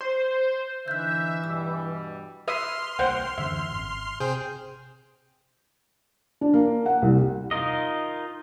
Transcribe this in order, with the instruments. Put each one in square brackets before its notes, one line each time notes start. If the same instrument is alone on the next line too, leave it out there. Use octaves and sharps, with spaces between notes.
[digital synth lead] C5
[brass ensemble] D3 D#4 E5 [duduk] E3 [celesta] F#6 G6
[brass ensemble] G2 B2 G3 [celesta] E6
[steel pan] B4 E5 D#6 [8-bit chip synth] C6 F6
[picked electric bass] C2 A#3 [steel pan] C5 F#5 G5
[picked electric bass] F#2 D3 E3 [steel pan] E5
[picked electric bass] G#1
[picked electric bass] C3 [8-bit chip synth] G#4 C5 G5
[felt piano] D4
A#3
F#5
C2
[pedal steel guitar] D#4 F4 A#4 D#5